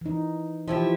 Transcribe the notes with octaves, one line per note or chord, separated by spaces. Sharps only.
E3 D#4
E3 F3 E4 G4